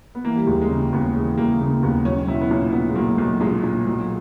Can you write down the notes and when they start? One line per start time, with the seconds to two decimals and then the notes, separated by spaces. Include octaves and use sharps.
0.15 B3
0.24 E3 A#3
0.36 G3
0.47 D#2 G#3
0.62 G#3
0.70 C#3 A#3
0.92 D#2 B3
1.16 E3 G#3
1.37 D#2 A#3
1.51 G#3
1.60 C#3 A#3
1.83 D#2 B3
2.05 B1 C#4
2.27 B1 E4
2.41 B3
2.50 A#2 C#4
2.73 A#2 B3
2.89 G#3
2.95 B1 A#3
3.18 B1
3.41 A#2 G#3
3.63 A#2
3.87 B1